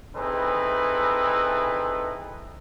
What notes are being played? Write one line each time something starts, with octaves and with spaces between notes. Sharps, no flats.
C4 D#4 E4 G#4 A4 B4